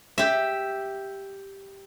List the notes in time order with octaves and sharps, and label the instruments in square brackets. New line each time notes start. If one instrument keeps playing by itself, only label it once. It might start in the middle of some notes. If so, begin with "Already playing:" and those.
[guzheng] G4 E5